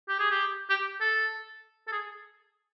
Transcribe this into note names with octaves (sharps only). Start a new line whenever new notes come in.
G4
G#4
G4
G4
A4
A4
G#4